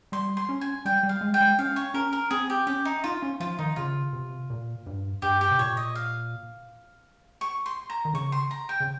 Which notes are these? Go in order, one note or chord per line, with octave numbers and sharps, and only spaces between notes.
G3 C6
C6
C#4
G#5
G3 G5
G3
F5
G#3
G5
G#3
C#4 F5
C#5
C#4 A#4
A#4
C4 G#4
G4
C#4 G4
D#4
D#4 F4
C#4
F3 F4
D#3 D#4
C#3 F4
C3
A#2
G2
G2 G4
G4
C3
A#2 C#5
D#5
F5
C#6
C6
A#5
D#3
C#3 C#6
C6
A#5
G5
C#3